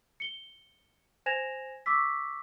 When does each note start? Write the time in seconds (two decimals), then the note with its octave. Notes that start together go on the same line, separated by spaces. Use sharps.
0.20 C#7 G7
1.26 C5 G#5 G#6 A#6 E7 F7
1.86 C#6 D6 E6 B6